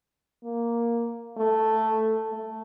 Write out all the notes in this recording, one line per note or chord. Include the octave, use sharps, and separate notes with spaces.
A#3
A3
A3